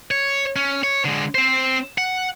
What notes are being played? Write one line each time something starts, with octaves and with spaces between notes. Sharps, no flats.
C#5
C#4
C#5
D3 G#3
C4 C5
F#5